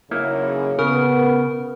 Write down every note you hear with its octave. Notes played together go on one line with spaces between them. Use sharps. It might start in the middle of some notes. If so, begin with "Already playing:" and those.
F#2 C#3 A#3 D#4 E4
C#3 B3 A#4